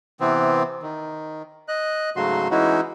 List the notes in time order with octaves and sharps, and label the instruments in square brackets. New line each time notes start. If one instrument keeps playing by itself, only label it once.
[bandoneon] C3 E3 B3 C4
D#3
D#5 F#6
G#2 C#3 F#3 A3 F#4 C6
E3 G#3 C#4 D#4 E4 F#4